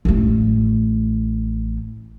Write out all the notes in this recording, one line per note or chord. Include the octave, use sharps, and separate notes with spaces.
A1 A3